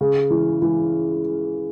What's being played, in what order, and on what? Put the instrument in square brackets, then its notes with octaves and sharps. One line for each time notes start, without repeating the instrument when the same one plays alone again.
[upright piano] C#3
E3
E3